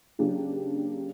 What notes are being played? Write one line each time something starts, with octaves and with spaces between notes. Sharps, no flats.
C#3 F#3 A#3 D4 G4